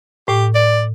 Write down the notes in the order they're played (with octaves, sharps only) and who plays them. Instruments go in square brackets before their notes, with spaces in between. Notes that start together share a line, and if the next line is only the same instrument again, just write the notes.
[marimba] A2 [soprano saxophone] G4
[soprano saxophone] D5